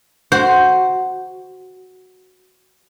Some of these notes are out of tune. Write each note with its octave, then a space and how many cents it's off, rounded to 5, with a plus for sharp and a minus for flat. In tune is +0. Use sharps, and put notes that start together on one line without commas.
F#4 +0 C5 +0